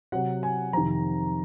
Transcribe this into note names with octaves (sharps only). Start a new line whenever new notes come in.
C3 F#3 F#5
G#5
F2 C3 D#3 A#5